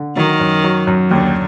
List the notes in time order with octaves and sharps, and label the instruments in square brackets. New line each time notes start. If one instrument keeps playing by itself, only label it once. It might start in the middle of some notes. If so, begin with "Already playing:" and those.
Already playing: [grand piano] D3
[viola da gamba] D#3 [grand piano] F#3
[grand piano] F#2
F#3
F#2
[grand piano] D#2 [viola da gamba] D3